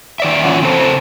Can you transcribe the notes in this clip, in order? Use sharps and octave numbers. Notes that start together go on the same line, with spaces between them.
D#3 D5 E5
A#2 E3 F#3 C#4 F4 F#5
C#3 C4 F4 A4 C5 A5